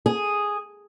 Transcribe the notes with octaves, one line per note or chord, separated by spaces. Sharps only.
G#4